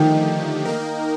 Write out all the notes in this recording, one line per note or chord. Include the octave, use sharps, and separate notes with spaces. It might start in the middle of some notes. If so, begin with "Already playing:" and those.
Already playing: D3 D#3 F3 A3 D#4 G4
A#3 D#4 A#4